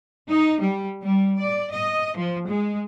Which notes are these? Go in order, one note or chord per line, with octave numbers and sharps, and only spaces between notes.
D#4
G3
G3
D5
D#5
F3
G#3